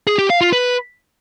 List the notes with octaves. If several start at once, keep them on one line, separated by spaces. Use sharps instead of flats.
G#4
G4
F5
F4
B4